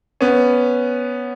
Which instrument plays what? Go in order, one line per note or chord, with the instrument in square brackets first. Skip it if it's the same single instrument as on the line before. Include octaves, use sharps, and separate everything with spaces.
[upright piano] B3 C#4